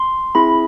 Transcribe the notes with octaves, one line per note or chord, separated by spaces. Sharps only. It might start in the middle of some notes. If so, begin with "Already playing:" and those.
Already playing: C6
C4 E4 G#4 B5